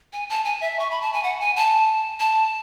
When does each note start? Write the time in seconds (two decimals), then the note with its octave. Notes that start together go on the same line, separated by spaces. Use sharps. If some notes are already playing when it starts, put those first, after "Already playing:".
0.13 G#5
0.30 A5
0.45 G#5
0.61 E5
0.79 C#6
0.91 B5
1.02 A5
1.13 G#5
1.23 F#5
1.40 G#5
1.56 A5
2.20 A5